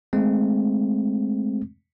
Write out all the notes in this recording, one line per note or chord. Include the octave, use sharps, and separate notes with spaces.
G#3 A3 C4